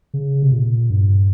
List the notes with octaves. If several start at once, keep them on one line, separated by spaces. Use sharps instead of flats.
C#3
C3
A#2
G2